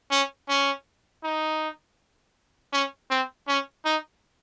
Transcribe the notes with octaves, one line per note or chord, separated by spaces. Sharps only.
C#4
C#4
D#4
C#4
C4
C#4
D#4